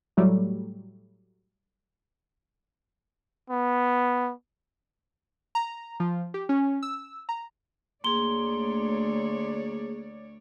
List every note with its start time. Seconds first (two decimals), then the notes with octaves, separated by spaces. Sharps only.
0.17 A2 F#3 G3 A3
3.50 B3
5.55 A#5
6.00 F3
6.34 G4
6.49 C#4
6.83 E6
7.29 A#5
8.04 D2 A#3 G#4 C#5 D5 C6 G7